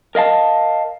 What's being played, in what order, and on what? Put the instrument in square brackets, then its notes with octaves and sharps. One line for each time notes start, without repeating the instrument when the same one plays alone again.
[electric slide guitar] A#4 D#5 F5 A5